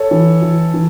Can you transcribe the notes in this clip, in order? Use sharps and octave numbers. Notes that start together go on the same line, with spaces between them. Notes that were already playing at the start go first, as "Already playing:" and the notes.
Already playing: A4 C#5
E3
E3
E3